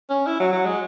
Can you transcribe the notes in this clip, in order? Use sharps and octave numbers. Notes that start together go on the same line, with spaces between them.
C#4
E4
F#3
F#3
G#3